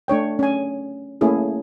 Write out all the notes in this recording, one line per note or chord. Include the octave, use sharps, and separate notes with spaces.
A3 D4 C#5 G5
C#4 G#5
A3 A#3 C#4 E4 G#4